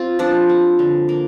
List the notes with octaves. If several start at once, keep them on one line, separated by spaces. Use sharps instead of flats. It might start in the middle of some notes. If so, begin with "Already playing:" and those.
Already playing: C4 F4
F3 D4
C4
D3
A#3